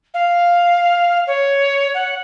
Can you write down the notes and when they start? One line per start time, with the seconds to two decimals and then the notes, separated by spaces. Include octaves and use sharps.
0.14 F5
1.27 C#5
1.94 F#5